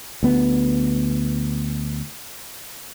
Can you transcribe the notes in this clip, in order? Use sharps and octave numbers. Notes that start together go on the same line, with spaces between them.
D2 B3